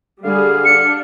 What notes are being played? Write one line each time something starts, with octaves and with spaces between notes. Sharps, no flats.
D3 G3 G#4 F5
D4 C#7